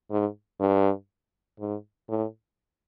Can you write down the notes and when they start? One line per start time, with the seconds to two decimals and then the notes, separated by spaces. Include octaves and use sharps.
0.11 G#2
0.60 G2
1.60 G#2
2.09 A2